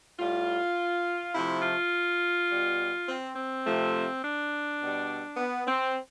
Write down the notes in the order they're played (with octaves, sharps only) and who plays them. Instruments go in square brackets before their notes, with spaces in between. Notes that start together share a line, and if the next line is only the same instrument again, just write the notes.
[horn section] A2 G3 F4
C3 F3 A3 E4
F4
B2 G3
C4
C4
C3 F3 A3
D4
B2 G3
B3
C4